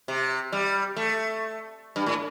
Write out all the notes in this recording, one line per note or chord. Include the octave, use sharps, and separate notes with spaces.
C3
G3
A3
G2
A2